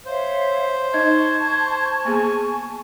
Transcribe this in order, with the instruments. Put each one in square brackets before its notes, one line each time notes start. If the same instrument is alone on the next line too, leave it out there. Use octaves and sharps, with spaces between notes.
[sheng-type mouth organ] C5 [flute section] C#5 E5 F5
[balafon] D#4 D#5 [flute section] A5 C#6 [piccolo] G#6
[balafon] A#3 B3 G#4 [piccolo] G#5